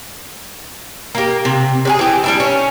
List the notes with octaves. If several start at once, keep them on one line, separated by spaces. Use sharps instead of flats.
A#3 G4
C3
C3 G4 G#4
E3 G4
G3 D4 E4
C#4